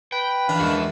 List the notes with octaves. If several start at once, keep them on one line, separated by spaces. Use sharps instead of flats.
B4 G5
A#1 E3 D4 D#5 F5
E2 G#3 F#4 E5 C#7
F5